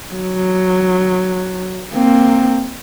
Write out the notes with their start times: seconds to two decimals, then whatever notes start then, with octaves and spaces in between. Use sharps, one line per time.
0.14 F#3
1.94 A#3 C4